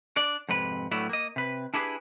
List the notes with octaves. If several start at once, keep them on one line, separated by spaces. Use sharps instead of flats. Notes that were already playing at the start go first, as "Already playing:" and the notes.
D4 D5
F2 G#2 C3 B4
A2 F#3 A3 B3 D4 E4
A#3 D#5
C3 B4
D4 E4 G4 G#4 B4